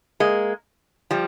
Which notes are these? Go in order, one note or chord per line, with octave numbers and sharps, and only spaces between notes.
G#3 A#3
F3 G3